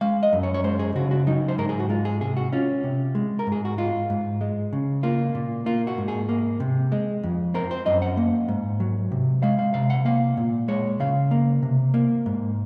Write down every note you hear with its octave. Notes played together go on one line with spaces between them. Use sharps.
G#3 F5
D#5
F#2
C#5
C#5
G#3 C5
G#4
C#3 F#4
F#4
F#3 D#4
C5
G#2 A#4
G#4
F#4
G#3 F4
G#4
C3 G#4
F#4
C#4 F4
C3
G#3
A#4
G#2 G#4
F#4
G#3 F4
G#2
G#3
C#3
A#3 F4
A#2
A#3 F4
F#4
G#2
G#4
A#3
C3
G#3
F2
C4 A#4
C5
F#2 D#5
F#5
A#3
G#2
F#3
C3
G#3 F5
F5
C3 F5
F#5
A#3 F5
A#2
G#3 C#5
C#3 F5
A#3
C3
A#3
G#2